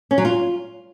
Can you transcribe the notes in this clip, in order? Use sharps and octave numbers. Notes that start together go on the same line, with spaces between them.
C#4
F#3
F4